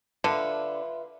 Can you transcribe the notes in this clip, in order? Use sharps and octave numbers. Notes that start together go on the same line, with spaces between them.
D3 F4 B4 E5